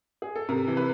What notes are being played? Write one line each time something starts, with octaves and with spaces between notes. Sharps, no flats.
G#4
A4
C3 A#4
E3
B4